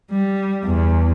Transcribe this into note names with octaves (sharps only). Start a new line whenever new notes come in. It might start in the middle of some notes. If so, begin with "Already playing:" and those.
G3
E2